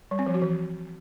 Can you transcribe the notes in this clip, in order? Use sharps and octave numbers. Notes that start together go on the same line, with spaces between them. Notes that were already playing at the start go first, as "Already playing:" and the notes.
G3
C4
F3
F#4
E3